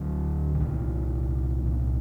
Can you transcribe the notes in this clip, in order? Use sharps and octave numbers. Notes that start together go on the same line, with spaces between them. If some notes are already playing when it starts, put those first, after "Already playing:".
Already playing: D2 D3 F#3
D3
C2 A#2 D#3
C2 A#2